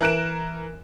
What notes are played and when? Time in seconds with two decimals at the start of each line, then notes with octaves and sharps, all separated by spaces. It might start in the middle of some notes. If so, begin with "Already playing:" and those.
0.01 E3 A#4 F#6 D7 E7